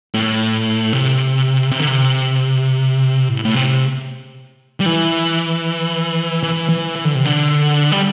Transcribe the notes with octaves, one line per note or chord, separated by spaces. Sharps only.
A2
C3
C3
D3
C3
A2
A2
C3
G3
E3
E3
E3
E3
D3
C3
D3
G3